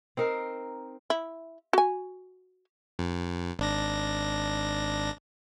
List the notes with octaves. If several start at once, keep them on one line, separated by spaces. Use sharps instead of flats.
C4 D#4 A#4
E4
F#4 G#5
F2
G#1 D4 A#6